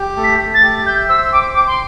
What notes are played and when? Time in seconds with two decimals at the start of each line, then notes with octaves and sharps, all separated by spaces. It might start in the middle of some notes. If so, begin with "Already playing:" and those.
Already playing: G4
0.17 A3
0.24 B6
0.39 A3
0.54 A6
0.63 G4
0.86 E5 G6
1.09 C5 E6
1.32 G5 D6
1.54 G5 D6
1.67 C6